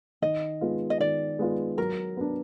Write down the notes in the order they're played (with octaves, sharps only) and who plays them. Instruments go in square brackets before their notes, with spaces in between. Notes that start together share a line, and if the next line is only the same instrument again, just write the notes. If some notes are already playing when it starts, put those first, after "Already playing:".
[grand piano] D#3 [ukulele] D#5
[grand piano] G#3 B3 F4
[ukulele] D#5
[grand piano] D#3 [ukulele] D5
[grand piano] G#3 B3 F4
[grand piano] F#3 [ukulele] A#4
[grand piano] B3 D4